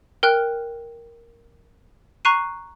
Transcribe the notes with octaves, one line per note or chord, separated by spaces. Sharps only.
A#4 G5 F6 F#6
A#5 C#6 F#6 C7 D#7